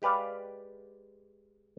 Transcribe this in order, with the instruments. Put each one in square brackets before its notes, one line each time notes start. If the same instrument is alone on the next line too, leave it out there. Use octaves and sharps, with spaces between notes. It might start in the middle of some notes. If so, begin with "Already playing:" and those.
[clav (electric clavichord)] G#3 G4 B4 D5 F5